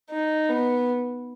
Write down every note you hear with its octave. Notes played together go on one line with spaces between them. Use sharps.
D#4
B3